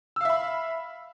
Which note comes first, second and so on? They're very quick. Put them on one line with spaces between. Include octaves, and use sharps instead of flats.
E6 F5 E5 B5